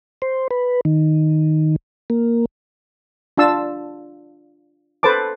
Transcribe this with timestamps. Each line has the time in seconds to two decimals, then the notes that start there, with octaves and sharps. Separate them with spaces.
0.22 C5
0.51 B4
0.85 D#3
2.10 A#3
3.38 D4 F4 A5 E6
5.03 A4 B4 C5 A5 D6